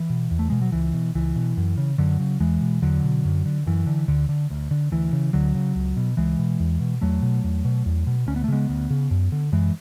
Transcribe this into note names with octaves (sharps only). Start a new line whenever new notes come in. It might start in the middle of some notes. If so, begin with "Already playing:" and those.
Already playing: E3
B2
E2
A3
B2 G#3
F#3
C#2 E3
B2
C#2 E3
B2
F#2
C#3
F#2 D3 F#3
C#3
E2 E3 G#3
B2
E2 D3 F#3
B2
F#2
D3
F#2 E3
D3
D2 D3
D3
D2
D3
D2 E3
C#3
D2 D3 F#3
C#3
C#2
B2
C#2 E3 G#3
B2
E2
B2
E2 F#3 A3
B2
E2
B2
E2
B2
D2 C#4
B3
A3
C#3 G#3 B3
D2
C#3
F#2
D3
F#2 E3 G#3